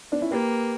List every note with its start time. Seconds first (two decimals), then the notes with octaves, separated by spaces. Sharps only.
0.12 B3 D4
0.21 C#4 E4
0.31 A#3 G4 B4